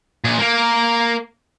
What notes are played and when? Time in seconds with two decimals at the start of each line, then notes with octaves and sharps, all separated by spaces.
0.24 A#2 G#4
0.39 A#3 A#4